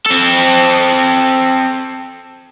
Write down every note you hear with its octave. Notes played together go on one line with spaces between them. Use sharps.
C4 A4